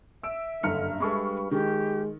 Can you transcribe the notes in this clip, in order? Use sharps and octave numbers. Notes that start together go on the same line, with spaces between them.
E5 E6 D7
F#1 G2 D3 A#5 F6 C#7
G2 G#3 G#4 A4 B5 C#6
D#3 G#3 G4